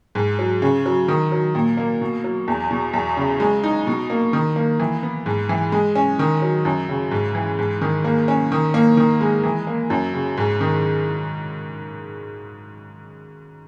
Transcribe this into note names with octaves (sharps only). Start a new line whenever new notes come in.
G#2
F#3
C#3
F#3
D#3
F#3
A#2
A#3
B2
F#3
E2
B2
E2
C#3
G#3
D#4
B2
A#3
D#3
A#3
E3
B3
G#2
E3
G#3
C#4
D#3
F#3
F#2
C#3
G#2
E3
G#2
D#3
A#3
C#4
D#3
A#3
D#3
G#3
E3
A#3
F#2
C#3
G#2
D#3